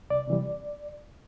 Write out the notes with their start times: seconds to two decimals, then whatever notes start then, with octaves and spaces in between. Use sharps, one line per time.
0.10 C2 D5
0.27 C3 E3 G3